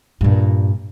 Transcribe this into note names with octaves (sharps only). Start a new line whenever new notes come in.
G2 A#2